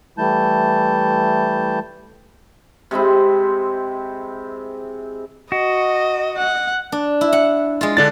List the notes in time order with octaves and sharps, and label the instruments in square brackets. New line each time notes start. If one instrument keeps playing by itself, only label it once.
[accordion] E3 G3 A3 E4 A5 G6
[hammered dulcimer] C3 G#3 C4 E4
[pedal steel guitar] F#4 [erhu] D#5
[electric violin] F#5
[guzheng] D4
E4
F#5
G#3 F4
[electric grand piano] D3 D4 A6